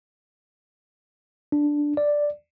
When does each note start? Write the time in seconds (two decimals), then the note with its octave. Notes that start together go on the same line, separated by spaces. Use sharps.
1.52 D4
1.97 D5